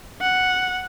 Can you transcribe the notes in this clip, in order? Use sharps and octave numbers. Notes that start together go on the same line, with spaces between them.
F#5